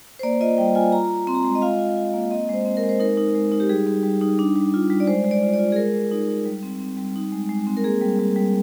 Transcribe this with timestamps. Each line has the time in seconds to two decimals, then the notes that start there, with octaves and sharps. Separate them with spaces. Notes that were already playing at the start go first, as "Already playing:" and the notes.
0.19 C5
0.23 A#3 D5
0.40 F4 D#5
0.58 G3 G5
0.75 F4 G#5
0.92 F4 A#5
1.10 F4
1.27 C4 C6
1.35 A#5
1.43 G#3 C6
1.55 D#5
1.62 F4 F5
1.79 F4
1.97 F4
2.14 A#3
2.31 C4 D#5
2.49 G#3 C5
2.66 C4
2.77 A#4
2.83 G#3
2.89 C5
3.00 D#4 A#4
3.17 D#4
3.35 G#3
3.52 D#4
3.60 G4
3.69 G3 G#4
3.87 G3
4.03 G3
4.21 D#4
4.39 D4
4.56 G3
4.74 F4
4.90 G3
5.00 D5
5.07 G#3 C5
5.24 G#3
5.31 D5
5.43 F4
5.53 D5
5.59 F4
5.72 G#4
5.76 G#3 A#4
5.94 G#3
6.11 D#4
6.28 D#4
6.46 G3
6.63 C4
6.80 C4
6.97 G3
7.16 D#4
7.32 G#3
7.49 G#3
7.67 C4
7.77 A#4
7.84 A#3 G#4
8.02 G3
8.19 G3
8.36 G3